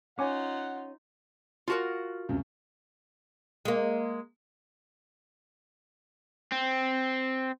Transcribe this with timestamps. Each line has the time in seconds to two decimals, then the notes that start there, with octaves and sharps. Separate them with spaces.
0.19 C#4 D#4 F4 C#5 F#5 G#5 D6
1.68 F4 F#4 A#4
2.29 C#2 F#2 C3
3.65 G#3 A#3
6.52 C4